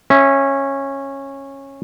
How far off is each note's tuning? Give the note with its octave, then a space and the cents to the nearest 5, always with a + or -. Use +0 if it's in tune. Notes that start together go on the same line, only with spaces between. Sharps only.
C#4 -15 E5 +0